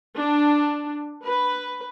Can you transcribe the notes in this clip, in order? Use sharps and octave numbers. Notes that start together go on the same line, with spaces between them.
D4
B4